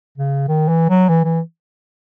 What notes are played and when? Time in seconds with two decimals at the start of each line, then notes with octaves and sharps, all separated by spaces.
0.18 C#3
0.48 D#3
0.68 E3
0.89 F#3
1.09 E3
1.24 E3